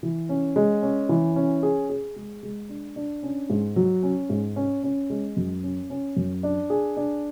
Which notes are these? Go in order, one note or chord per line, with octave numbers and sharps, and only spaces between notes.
E3
C#4
G#3
C#4
E3
C#4
G#4
G#4
G#3
G#3
D4
D4
C#4
G#2
F#3
C#4
G#2
C#4
C#4
G#3
F#2
C#4
C#4
F#2
D4
G#4
D4